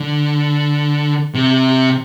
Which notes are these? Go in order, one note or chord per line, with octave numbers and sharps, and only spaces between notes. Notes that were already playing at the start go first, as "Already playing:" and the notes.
Already playing: D3
C3